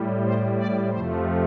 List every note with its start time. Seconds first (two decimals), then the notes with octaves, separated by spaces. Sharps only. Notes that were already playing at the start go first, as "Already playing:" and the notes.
Already playing: A2 G3
0.24 C5
0.57 D5
0.90 F2 C3 F3 A3 C5